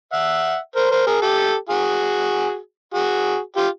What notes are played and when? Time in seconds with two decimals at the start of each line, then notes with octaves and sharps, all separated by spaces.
0.13 E5 F#5
0.76 A#4 C5
0.91 A#4 C5
1.07 G#4 A#4
1.22 G4 A4
1.69 F#4 G#4
2.94 F#4 G#4
3.56 F4 G4